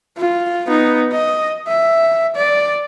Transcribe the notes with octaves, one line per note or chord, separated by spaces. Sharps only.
F4
B3 D#4
D#5
E5
D5